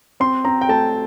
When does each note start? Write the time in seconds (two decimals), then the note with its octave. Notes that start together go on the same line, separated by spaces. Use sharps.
0.20 C4 C6
0.45 C4 A#5
0.61 G5
0.68 A3 A5